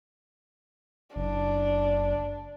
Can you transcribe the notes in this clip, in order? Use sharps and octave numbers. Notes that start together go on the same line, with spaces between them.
F#1 D4